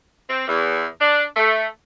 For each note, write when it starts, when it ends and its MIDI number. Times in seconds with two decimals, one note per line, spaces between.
0.29 0.46 60
0.48 0.86 40
1.00 1.24 62
1.37 1.66 57